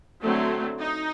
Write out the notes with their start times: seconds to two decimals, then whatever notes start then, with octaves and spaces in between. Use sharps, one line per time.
0.22 D3 F#3 A3 C4
0.79 D#4